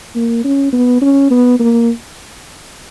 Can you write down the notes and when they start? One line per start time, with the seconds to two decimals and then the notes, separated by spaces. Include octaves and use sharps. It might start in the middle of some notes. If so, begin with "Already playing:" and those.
0.15 A#3
0.44 C#4
0.73 B3
1.01 C#4
1.31 B3
1.60 A#3